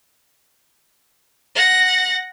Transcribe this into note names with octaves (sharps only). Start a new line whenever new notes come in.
F#5 A#6